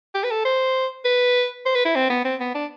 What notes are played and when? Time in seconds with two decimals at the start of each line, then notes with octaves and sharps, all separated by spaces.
0.15 G4
0.24 B4
0.31 A4
0.45 C5
1.05 B4
1.66 C5
1.75 B4
1.85 E4
1.96 C4
2.10 B3
2.25 C4
2.40 B3
2.55 D4